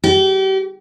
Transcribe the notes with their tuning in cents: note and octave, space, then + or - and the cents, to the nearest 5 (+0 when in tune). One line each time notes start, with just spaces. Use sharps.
G4 -35